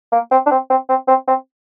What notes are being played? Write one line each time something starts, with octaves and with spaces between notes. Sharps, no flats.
A#3
C4
D4
C4
C4
C4
C4
C4